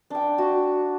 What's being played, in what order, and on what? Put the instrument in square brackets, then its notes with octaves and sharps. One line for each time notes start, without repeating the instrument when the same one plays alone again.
[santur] D4 G5
F#4